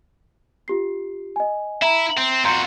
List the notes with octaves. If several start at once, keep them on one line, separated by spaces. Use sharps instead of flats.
F4 G4 C7
D#5 G#5
E4 E5 A#5
C4
F2 F#4 A#5 C6 G6